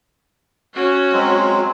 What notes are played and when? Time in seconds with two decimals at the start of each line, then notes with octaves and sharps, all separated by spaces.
0.74 C#4 F#4
1.13 F#3 G#3 C4